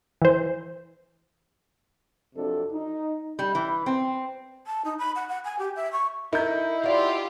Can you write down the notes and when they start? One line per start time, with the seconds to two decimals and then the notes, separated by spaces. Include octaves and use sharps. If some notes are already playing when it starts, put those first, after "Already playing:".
0.22 E3 C5
2.35 F2 C3 F#3 D4 A4
2.72 D#4
3.39 G3
3.55 E3
3.86 C4
4.67 A5
4.85 D#4
4.99 B5
5.16 F#5
5.29 F#5
5.45 G#5
5.59 G4
5.76 E5
5.92 C#6
6.33 D#4 E4 A#4 G6
6.84 F#3 F4 G4 D5